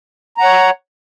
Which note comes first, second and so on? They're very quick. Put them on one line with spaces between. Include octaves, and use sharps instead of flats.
A#5 F#5 C#5